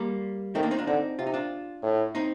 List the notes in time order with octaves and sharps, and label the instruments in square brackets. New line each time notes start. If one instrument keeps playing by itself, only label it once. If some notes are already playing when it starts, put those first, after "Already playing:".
Already playing: [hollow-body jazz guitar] G3 A#3
[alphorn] D#3 [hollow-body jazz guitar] A3 C4
[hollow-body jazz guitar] A#3 D4
C4 D#4
D4 F4
[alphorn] D3 [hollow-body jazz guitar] C4 D#4
[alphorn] C3 [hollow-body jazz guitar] F4
[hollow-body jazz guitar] D#4
D4 F4
[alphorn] A2
[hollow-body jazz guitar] C4 D#4